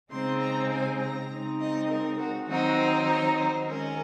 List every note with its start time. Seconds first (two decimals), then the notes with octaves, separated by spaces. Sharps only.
0.11 C#3 G#3 C4 D#4 C6
0.41 A#5
0.71 G#5
1.00 A#5
1.30 C#3 G#3 C4 D#4
1.60 D#5
1.89 A#4
2.19 F#4
2.48 D#3 F#3 C4 D#4 F#4
2.78 C5
3.07 C#5
3.37 C5
3.67 D#3 G#3 C#4 A#4